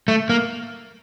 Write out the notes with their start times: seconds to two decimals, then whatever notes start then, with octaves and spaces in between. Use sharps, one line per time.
0.08 A3
0.30 A#3